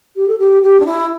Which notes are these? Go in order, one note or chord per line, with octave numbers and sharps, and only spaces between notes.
G4
A4
G4
G4
D4
E4